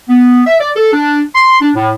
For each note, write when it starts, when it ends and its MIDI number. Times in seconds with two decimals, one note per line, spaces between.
0.09 0.42 59
0.47 0.55 76
0.60 0.70 74
0.76 0.90 69
0.93 1.22 62
1.35 1.57 84
1.61 1.71 62
1.76 1.90 45